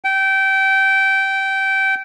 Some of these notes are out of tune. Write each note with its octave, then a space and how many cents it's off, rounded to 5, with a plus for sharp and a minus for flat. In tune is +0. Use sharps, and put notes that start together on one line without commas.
G5 -20